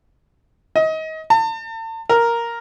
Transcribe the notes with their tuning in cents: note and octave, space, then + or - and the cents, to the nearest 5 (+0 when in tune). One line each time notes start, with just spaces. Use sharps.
D#5 +30
A5 +40
A#4 +0